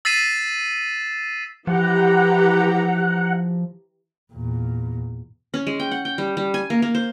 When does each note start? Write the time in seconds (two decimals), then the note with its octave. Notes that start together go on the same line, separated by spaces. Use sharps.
0.05 E6 A6 B6 C7 D#7 E7
1.67 E3 F3 G4 F#5 A#5
4.33 E2 A#2
5.54 C#4
5.67 G#3
5.80 G5
5.91 F#5
6.05 G5
6.18 G3
6.37 G3
6.54 G#5
6.70 A#3
6.82 A#3
6.95 C5